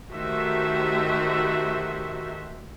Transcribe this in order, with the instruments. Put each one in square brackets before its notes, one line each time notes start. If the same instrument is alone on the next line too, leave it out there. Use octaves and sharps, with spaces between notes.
[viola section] D#3 A3 F#4 G4 C5 E5